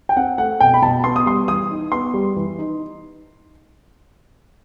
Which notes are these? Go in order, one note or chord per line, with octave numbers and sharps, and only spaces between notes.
G5
C4 F#5
A3 F#5
B2 G5
B5
B2 A5
B3 C6
D#6
G3 C6
E3 D#6
D#4
B3 C6
G3
E3
D#4